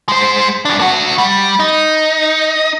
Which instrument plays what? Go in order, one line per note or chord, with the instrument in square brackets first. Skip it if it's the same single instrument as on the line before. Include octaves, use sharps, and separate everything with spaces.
[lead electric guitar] G#3 C5
F#2 D4
D4 F#4
G3
D#4